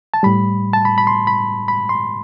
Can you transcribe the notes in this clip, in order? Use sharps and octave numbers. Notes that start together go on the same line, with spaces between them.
A5
A2 G3 B5
A5
B5
B5
C6
B5
B5
C6